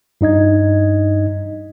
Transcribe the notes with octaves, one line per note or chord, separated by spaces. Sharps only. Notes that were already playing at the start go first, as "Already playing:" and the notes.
G2 D#4 D#5 G#6